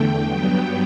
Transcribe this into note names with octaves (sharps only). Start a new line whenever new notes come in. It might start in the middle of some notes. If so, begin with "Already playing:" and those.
Already playing: E2 D3 A3 G5
G2 F#3 B3 G5